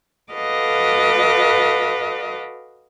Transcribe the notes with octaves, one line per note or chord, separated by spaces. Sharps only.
F#4 A4 B4 D#5 F5 D6